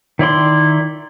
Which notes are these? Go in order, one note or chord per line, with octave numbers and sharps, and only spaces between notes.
D#3 E4 D5 C6